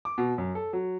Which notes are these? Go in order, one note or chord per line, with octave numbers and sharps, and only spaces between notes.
D6
B2
F#2
A4
F#3